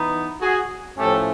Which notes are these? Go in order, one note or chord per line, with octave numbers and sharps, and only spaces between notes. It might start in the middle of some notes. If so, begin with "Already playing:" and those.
Already playing: E3 B3 D#4
F#4 G#4
A2 F3 A3 C#4 G4 A4